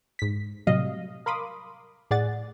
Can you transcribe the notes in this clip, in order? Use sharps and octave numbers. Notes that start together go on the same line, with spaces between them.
G#2 B6
A2 C3 F#3 G3 D#5 F5
A#4 F5 B5 C6 D6 D#6
A2 G#4 D5 F#5 A6